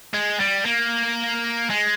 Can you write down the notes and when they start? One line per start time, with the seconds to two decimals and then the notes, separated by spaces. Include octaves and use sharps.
0.14 G#3
0.40 G3
0.66 A#3
1.70 G#3